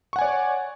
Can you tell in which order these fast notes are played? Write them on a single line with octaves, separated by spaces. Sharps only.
C#6 F#5 G#5 D5 C#5